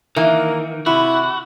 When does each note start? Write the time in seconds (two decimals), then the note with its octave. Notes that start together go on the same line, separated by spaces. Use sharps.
0.16 D#3 E3 A#3
0.86 C3 E4 F#4 B5